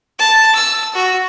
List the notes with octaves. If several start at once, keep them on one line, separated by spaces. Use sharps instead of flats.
A5
E6
F#4